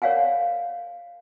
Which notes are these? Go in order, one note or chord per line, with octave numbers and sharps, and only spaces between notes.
A#4 C#5 D5 F5 F#5 G#5